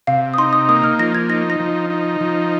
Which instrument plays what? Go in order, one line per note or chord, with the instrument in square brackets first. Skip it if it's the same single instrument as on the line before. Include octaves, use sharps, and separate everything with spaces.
[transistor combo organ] C3 [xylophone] F5
[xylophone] D#6
[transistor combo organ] D#4 [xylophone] C6
[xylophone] D#6
[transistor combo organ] A#3 [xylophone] D#6
[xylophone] F6
[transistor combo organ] F3 [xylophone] A#6
[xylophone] G#6
[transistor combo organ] D#4 [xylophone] A#6
[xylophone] A#6
[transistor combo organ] F3
D#4
F3